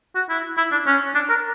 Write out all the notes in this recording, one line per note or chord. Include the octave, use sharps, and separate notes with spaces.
F#4
E4
E4
D4
C#4
D4
A#4